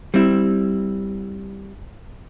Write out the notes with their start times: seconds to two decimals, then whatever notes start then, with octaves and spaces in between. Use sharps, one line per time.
0.14 G3 C4 E4